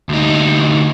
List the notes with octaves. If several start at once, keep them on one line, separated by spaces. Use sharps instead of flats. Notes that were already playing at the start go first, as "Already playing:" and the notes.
D2 D#4